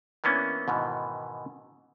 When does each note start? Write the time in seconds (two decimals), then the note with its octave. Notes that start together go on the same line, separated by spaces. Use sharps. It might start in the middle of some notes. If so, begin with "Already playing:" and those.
0.24 E3 A#3 B3 C#4 D4 E4
0.68 G#2 B2 D#3 E3